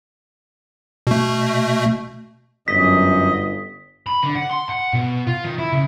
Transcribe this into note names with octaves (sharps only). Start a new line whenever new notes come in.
B2 A3
G1 F#2 D#5 B6
B5
D3
F#5
C6
F#5
B2
F4
D#3
E4
C#3